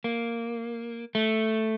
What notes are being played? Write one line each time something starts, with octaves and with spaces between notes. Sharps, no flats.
A#3
A3